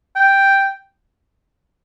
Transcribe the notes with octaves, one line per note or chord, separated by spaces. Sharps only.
G5